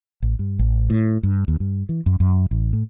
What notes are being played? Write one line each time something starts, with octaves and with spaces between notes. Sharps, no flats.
A1
G2
A1
A2
G2
D#2
G2
E3
F#2
F#2
A1
A2